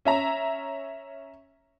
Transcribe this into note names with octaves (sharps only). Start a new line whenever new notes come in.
C#4 E5 A#5